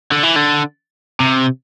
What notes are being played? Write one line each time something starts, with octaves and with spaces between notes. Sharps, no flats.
D3
E3
D3
C3